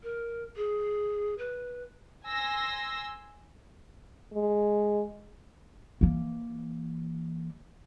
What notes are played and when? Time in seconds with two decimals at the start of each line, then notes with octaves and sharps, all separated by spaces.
0.03 A#4
0.57 G#4
1.38 B4
2.27 G#5 C6 E6 A#6
4.33 G#3
6.01 E3 A#3